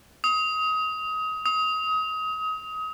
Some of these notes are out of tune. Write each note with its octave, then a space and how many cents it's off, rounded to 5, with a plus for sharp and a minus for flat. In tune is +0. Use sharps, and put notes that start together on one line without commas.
D#6 +25
D#6 +30